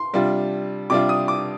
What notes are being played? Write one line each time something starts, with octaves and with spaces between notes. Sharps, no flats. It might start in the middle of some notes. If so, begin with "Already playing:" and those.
Already playing: C6
C3 G3 D4 F4
C3 G3 D4 F4 D6
D#6
D6